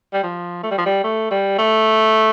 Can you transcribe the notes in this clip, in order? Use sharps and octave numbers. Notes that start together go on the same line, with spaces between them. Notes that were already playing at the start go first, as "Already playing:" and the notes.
G3
F3
A3
G3
F3
G3
A3
G3
A3